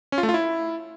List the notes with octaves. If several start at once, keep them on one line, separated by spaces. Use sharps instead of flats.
C#4
F4
A3
F4
E4